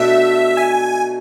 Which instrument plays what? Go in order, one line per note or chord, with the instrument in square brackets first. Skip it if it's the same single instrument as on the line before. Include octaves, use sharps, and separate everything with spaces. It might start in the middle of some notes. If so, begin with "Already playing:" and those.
Already playing: [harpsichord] B2 A3 D4 [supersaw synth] E5
[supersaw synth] G#5